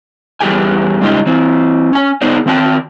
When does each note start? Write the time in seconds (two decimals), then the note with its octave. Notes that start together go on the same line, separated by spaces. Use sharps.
0.40 E2 G3 G4 G#4 G5 G#5
1.01 G2 C#3 G#3 D#4 F4 G4
1.26 E3 C4
1.93 C#4 G#5
2.22 B3 D#4 G#4 C5 D5
2.46 D#3 C4 G5 A5